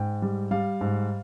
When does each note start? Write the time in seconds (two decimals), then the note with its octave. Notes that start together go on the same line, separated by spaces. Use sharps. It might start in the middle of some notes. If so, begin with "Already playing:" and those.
Already playing: G#2 G5
0.22 G3
0.51 G3 F5
0.81 G#2